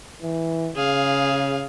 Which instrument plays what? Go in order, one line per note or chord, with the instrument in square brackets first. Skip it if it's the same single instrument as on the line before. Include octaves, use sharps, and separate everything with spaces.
[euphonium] E3
[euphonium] C#3 [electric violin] G#4 F5